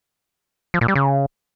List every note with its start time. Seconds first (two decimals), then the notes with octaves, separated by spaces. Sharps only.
0.74 F3
0.81 A#2
0.88 G3
0.95 C#3